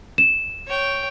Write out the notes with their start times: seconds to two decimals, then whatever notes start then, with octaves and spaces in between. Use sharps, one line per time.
0.18 E7
0.67 C#5 G5